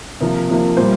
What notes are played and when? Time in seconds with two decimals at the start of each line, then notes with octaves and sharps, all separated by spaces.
0.21 C3 F3 A#3 A#4
0.49 C3 F3 A#3
0.77 A#2 G3 C5